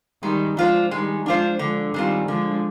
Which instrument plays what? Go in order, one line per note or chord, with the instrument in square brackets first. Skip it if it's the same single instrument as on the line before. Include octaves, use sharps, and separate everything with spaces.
[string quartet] D#3 G3 [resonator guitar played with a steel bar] G#3
[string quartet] F3 G#3 [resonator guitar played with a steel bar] D4 F4 C5
[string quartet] D#3 G3 [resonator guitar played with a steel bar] G#3
[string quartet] F3 G#3 [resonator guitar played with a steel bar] D4 F4 C5
[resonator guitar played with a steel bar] D3 [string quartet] F3 G#3
[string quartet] D#3 G3 [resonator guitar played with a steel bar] G#3 C4 F4
[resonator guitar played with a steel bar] D3 [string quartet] F3 G#3